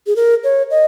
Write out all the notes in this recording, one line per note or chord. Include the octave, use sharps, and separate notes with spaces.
G#4
A#4
C#5
D#5